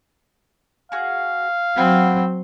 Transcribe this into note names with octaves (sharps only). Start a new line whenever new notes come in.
F#4 G#4 F5
F#3 C4 F#5 G#5 B5